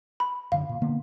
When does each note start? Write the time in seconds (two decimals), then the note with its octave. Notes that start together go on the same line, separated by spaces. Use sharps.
0.20 B5
0.52 F#2 D3 F5
0.69 A#2
0.82 D3 A#3 B3